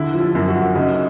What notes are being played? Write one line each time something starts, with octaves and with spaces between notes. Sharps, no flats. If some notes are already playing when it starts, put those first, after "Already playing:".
Already playing: D3 E4
F3
F4
F#2
F#4
F#2
C#3 D#4